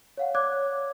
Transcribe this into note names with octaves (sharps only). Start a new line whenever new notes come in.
C#5 F5 F#5
C#5 D5 D6 F#6 G#6